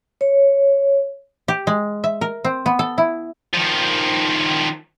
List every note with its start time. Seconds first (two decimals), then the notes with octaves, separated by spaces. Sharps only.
0.21 C#5
1.48 G4
1.67 G#3
2.04 E5
2.21 A#4
2.45 C4
2.66 B3
2.79 A4
2.98 E4
3.54 D#3 F3